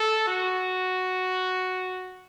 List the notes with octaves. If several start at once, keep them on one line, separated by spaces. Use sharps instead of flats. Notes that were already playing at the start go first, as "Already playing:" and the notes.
Already playing: A4
F#4